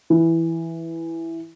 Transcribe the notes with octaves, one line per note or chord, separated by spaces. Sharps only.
E3